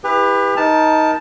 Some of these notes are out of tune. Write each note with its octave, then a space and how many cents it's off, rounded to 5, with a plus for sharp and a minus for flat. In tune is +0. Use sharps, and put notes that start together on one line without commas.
E4 +0 G4 +40 B4 +0
D#4 +15 A#4 +15 A5 +0